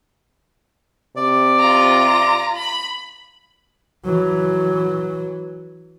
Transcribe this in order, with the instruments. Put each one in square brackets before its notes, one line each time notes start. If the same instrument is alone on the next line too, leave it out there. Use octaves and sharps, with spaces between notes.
[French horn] C3 [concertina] D5
[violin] F4 A#5
B5
[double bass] E3 F#3